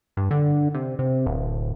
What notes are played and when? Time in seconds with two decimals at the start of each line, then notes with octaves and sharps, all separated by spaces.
0.17 G2
0.31 D3
0.75 C3
0.99 C3
1.26 D1